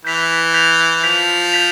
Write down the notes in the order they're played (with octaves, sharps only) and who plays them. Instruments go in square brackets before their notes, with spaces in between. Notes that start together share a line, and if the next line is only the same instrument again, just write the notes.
[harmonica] E3 [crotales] G6 B6 F7
[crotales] G6 B6 F7
[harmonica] F3 [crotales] G6 B6 F7
[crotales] G6 B6 F7